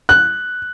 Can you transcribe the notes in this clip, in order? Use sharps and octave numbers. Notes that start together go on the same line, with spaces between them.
F#6